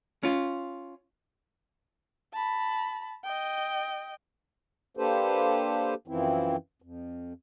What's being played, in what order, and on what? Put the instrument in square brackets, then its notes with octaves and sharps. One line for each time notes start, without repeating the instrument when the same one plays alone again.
[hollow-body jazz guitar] C#4 F4
[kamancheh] A5 B5
D#5 G5
[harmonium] A#3 D4 G4 A4 B4 C5
F#2 E3 F3 C4 E4
F2